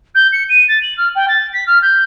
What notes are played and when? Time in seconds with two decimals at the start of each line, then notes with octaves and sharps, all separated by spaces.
0.15 G6
0.32 C#7
0.49 D#7
0.68 A6
0.83 F#7
0.97 F6
1.15 G5
1.28 A6
1.53 B6
1.67 F6
1.82 G6